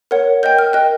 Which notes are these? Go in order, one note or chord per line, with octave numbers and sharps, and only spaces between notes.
A#4 C#5 F#5
A#4 D#5 G5 G6
F6
A#4 D#5 G5 F#6